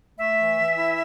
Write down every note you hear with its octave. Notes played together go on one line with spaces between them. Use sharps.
A3 E5
E3
E3
E4